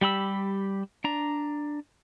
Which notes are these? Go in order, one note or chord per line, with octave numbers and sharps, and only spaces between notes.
G3 G4 B5 E6
D4 A#5